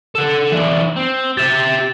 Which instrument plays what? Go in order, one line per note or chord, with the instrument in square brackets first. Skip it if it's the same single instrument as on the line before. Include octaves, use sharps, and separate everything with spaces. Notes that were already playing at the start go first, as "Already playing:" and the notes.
[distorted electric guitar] A4 F#5 [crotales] E7
[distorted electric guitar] E3 D4
C4
[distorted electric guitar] G4 E5 [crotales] A6 E7
[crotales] A6